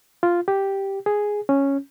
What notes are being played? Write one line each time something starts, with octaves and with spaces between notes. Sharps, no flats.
F4
G4
G#4
C#4